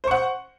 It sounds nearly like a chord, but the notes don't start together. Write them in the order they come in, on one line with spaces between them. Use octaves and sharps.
C5 C#6 F#5